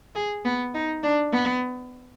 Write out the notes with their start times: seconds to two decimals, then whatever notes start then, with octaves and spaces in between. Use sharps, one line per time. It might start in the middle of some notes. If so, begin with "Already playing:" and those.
0.15 G#4
0.45 B3
0.74 D#4
1.03 D4
1.32 B3